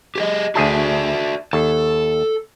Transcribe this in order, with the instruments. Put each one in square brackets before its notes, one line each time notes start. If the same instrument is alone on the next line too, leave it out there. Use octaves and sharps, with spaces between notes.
[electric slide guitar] G4 G#4 D#5
[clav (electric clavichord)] D2 G#4 A5 [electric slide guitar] F#4 D5 E5
[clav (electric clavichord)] D#2 [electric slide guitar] A4